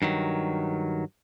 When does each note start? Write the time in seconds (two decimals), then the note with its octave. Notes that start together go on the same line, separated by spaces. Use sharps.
0.02 G2 D#3 F#3